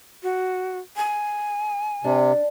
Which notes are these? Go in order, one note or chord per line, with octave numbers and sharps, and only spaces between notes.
F#4
G#5
C3 D4